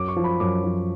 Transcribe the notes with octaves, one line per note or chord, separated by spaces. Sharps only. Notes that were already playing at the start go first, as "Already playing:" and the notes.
Already playing: F#2 F#3 D6
C#6
F3
B5
F#2 D6
F3